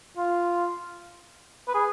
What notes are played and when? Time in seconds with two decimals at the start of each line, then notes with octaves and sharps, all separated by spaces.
0.17 F4
1.68 B4
1.74 G#4